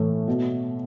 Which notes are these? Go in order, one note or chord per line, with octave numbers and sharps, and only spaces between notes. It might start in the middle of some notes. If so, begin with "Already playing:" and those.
Already playing: A2 E3 A3
B2